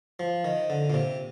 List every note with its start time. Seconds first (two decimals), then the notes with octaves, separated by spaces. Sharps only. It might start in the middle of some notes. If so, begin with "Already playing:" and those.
0.19 F3
0.44 D#3
0.70 D3
0.90 A#2
0.94 C3